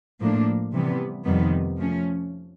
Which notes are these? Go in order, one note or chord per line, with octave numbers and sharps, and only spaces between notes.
A2 F3 A#3 D4
C3 E3 G3 B3
F2 C3 D#3 G3 B3
F3 A3 C#4